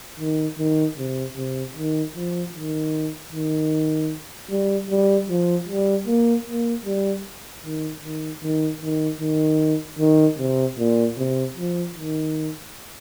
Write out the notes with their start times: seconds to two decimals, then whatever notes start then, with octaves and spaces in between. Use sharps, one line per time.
0.20 D#3
0.58 D#3
0.98 C3
1.37 C3
1.76 D#3
2.16 F3
2.55 D#3
3.33 D#3
4.50 G3
4.90 G3
5.29 F3
5.68 G3
6.07 A#3
6.47 A#3
6.85 G3
7.65 D#3
8.04 D#3
8.43 D#3
8.82 D#3
9.21 D#3
9.99 D#3
10.38 C3
10.78 A#2
11.18 C3
11.56 F3
11.95 D#3